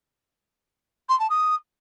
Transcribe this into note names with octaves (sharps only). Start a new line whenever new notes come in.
C6
A5
D#6